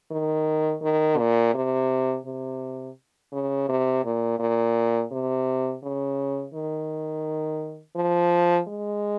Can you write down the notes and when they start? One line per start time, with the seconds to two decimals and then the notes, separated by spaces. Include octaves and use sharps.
0.11 D#3
0.83 D#3
1.18 A#2
1.54 C3
2.26 C3
3.32 C#3
3.69 C3
4.04 A#2
4.39 A#2
5.11 C3
5.83 C#3
6.54 D#3
7.96 F3
8.68 G#3